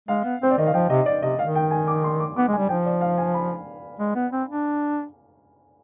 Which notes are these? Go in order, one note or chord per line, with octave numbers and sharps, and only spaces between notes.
G#3 F5
B3
C4 C5
D5
D#3 D#5
F5
F3 G5
C3 D#5
D5
C3 D#5
D#3 F5
G5
G#5
D6
C6
D6
B3 D6
G#3 G#5
G3
F3 G5
D5
F5
G#5
B5
G#3
B3
C4
D4